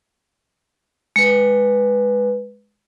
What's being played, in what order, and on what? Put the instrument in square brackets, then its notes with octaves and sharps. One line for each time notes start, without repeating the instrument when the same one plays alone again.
[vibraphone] G#3 B4